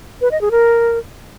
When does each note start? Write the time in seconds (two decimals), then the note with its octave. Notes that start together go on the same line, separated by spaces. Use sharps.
0.21 B4
0.31 D#5
0.41 G#4
0.51 A#4